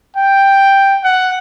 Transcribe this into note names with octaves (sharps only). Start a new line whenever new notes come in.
G5
F#5